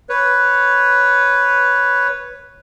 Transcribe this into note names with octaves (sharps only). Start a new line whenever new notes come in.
B4 C#5